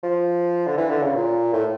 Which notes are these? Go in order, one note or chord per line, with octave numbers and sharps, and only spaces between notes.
F3
D3
E3
D3
C#3
A#2
A2